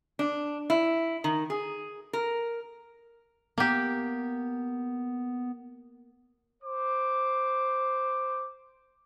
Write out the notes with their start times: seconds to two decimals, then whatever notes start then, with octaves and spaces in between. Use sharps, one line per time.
0.19 D4
0.70 E4
1.24 D#3
1.50 G#4
2.13 A#4
3.58 A#3 B3 G4
6.63 C5 D6